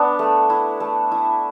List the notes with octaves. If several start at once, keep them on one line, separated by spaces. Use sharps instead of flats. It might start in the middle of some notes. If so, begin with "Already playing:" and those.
Already playing: B3 D4
A3
E4
A3
E4